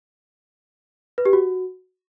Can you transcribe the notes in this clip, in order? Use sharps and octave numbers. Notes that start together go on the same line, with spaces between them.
B4
G4
F#4